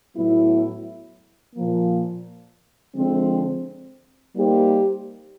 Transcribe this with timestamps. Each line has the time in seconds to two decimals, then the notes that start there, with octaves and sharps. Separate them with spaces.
0.16 A2 F#3 B3 E4
1.55 A#2 F3 A#3
2.95 D3 F3 G#3 C4
4.35 G3 A#3 D#4 G4 C5